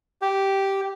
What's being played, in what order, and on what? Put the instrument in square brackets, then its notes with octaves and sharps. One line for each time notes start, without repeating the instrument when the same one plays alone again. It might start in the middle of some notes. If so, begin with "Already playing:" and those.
[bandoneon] G4